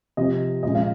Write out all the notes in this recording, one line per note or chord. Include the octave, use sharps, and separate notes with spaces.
C3 F3 C4 D#5
A#2 F3 G#3 C#4 D#5
F5